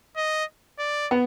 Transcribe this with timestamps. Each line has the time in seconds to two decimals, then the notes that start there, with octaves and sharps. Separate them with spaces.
0.16 D#5
0.79 D5
1.11 B3